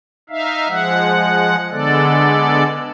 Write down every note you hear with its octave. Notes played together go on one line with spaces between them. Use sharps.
D#4 E5 F5
F3 G#3 F#5
D3 G#3 B3 A4 D5